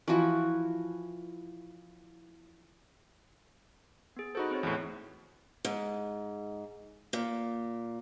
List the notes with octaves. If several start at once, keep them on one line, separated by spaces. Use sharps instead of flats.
E3 F3 F#4
B3 G#4
D#4 F#4 A4 C5 B5
C4 G#4 C#5
E2 A2
G#2
A#2